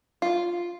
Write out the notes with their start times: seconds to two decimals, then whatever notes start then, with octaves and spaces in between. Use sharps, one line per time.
0.22 F4